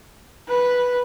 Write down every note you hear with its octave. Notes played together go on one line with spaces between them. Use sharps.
B4